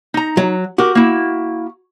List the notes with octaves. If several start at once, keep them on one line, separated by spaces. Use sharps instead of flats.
D#4 A#5
F#3
F#4 G4 A#4
A#3 E4